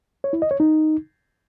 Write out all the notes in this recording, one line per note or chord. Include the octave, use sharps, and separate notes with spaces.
C#5
E4
D#5
C#5
D#4